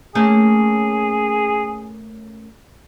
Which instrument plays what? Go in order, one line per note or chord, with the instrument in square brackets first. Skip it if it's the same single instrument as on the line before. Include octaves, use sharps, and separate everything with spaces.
[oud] A3 A#3 C#4 [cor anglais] G#4